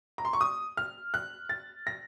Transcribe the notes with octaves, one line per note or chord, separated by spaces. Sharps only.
A#5
C6
C#6
D#6
F6
F#6
A6
A#6